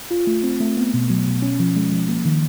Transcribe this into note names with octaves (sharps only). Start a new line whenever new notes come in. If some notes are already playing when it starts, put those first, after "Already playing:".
F4
A3
C4
A3
B3
B2
F#3
B2
C#4
F3
G#3
F3
A#3
D#3